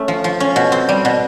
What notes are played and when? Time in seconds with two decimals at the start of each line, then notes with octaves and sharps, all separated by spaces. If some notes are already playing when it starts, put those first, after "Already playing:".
Already playing: A3 C#4
0.08 F3
0.24 F3
0.40 C#4
0.56 B2
0.72 C4
0.89 G3
1.05 B2